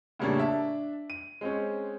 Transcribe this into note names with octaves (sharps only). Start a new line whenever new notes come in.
A2 C#3 G3 A#3 C#4 D4
D4 E5 A5
D#7
G#3 C4 C#4